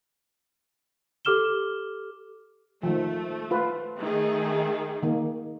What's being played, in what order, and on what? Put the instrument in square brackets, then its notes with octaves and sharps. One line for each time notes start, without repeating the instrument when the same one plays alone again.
[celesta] G4 A4 D6 F6 E7 G7
[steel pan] D#3 F3 [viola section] A3
[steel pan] F4 B4
[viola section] D#3 A3 G#4
[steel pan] D#3 A#3